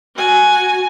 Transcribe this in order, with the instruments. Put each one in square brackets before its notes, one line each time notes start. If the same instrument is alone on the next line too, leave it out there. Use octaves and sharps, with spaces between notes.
[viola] F#4 G#5